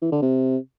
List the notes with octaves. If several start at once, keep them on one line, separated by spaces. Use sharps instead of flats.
E3
D3
C3